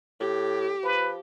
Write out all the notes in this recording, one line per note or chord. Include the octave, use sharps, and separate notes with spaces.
A2 G4
F3 B4